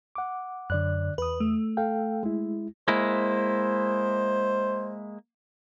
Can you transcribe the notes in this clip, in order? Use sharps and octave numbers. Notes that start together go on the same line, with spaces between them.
F#5 D6
F#2 D3 D5 F#6
E2 B4 D#6
A3
A4 F5 G5
G#3 E4
G#3 A#3 E4 C5